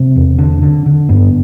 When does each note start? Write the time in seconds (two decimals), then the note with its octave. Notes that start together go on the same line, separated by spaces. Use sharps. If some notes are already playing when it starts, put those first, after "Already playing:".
Already playing: C3 C4
0.16 E2
0.38 D3
0.62 D3
0.86 D3
1.09 G2 B3